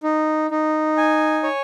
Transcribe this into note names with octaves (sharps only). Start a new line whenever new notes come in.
D#4
D#4
G#5
C#5